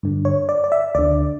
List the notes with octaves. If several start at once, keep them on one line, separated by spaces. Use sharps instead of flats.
G2 D3
C#5
D5
D5
E5
D2 D3 D5